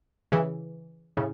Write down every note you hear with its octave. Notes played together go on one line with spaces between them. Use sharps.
C#3 E3
A2 C#3